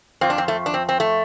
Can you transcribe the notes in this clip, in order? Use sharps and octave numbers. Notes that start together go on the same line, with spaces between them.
F2 F3 C4
D4
C4
A3
D4
C4
C4
A3